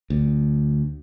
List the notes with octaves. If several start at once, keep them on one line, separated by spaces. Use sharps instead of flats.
D2